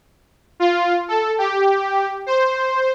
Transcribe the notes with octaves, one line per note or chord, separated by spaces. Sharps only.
F4
A4
G4
C5